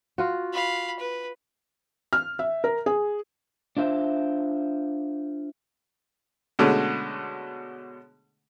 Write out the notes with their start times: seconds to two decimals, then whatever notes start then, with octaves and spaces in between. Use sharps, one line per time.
0.18 F4 F#4
0.53 F5 B5
0.99 B4
2.13 F6
2.39 E5
2.64 A#4
2.86 G#4
3.77 D4 F4 C5 E5
6.59 B2 D3 G#3 A3 C#4